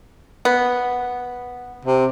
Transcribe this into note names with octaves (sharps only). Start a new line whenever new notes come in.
B3
C3